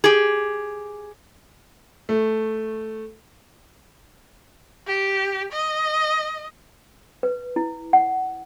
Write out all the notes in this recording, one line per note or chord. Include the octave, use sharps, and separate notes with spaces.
G4 G#4
A3
G4
D#5
B4
E4
F#5